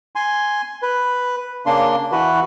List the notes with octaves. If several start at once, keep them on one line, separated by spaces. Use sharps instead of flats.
G#5 C6
B4
C#3 A#3 D4 C6
E3 F#4 B4